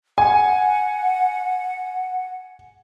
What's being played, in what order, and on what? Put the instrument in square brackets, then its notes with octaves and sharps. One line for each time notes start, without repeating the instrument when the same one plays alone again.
[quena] F#5 [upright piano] G#5